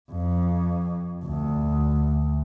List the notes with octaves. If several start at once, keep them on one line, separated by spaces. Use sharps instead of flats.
F2
D2